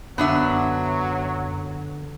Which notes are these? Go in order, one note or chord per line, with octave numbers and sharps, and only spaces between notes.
F#2 D3 F#3 B3 D4 E5